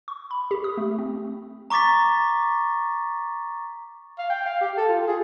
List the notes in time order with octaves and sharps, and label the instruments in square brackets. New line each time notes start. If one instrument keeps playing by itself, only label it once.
[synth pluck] C#6
B5
G4
D#6
A3
C4
[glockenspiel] A#5 C#6 D6 A6 B6
[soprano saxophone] F5
G5
F5
G4
A4
F4
G#4